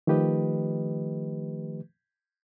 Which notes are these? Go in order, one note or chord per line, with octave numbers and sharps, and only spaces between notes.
D#3 F3 A3 G4 B4 D#5